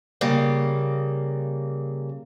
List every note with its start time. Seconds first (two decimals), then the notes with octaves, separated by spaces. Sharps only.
0.21 C#3 G3 A#3